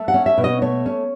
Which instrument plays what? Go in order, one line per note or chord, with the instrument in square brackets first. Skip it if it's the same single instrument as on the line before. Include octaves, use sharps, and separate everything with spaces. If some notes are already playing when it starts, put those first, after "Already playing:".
Already playing: [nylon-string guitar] A3
F#5
C#4
E5
B2
D#5
A3 C#5
C#4